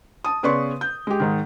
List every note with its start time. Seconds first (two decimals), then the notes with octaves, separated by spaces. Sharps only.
0.24 A5 D#6
0.43 C#3 B3 B4 D5 C6 C#6
0.81 G6
1.07 G#3 G4
1.20 G#2 D#3